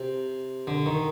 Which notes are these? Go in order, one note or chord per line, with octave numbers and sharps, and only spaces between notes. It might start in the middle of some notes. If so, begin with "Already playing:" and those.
Already playing: C3
D3
D#3